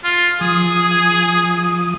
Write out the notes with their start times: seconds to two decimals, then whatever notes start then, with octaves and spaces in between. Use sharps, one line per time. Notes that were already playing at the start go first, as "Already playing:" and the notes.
0.05 F4
0.41 F3 G#4 D#6